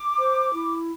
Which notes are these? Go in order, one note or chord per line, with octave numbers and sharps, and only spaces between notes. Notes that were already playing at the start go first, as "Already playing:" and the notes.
Already playing: D6
C5
E4